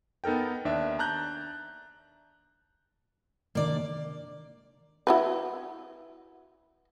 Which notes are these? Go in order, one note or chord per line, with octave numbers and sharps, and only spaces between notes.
B3 D#4 A4 A#4 G5
D#2 D4 E5
A5 A#5 F#6 G6
C3 D#3 A#3 D4 D5
E4 F#4 B4